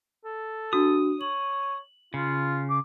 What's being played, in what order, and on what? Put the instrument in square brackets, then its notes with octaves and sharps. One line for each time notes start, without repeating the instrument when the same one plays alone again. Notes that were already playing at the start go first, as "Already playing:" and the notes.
[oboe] A4
[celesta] D4 F#4 [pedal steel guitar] D#6
[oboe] C#5 [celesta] F#7
[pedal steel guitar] C#3 [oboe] F4
[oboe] D6